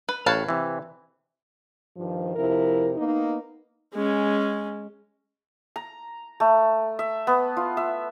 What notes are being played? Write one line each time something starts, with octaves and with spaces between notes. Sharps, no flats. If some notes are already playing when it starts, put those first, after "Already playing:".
B4
A1 B4 C#5 F5 A5
C3 E3
G2 D#3 F3
F2 C3 F3 E4 A#4
A#3 B3 D#4
G#3 C#4
A#5
A3
E5
B3
F4
E5